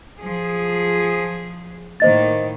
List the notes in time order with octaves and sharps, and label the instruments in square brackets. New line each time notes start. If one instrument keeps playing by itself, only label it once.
[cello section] F3 G#4
[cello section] A2 D#3 A#3 [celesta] C5 D#5 A6